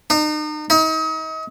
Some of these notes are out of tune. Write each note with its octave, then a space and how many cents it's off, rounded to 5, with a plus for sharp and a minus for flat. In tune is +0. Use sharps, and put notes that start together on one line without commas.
D#4 -40
D#4 +35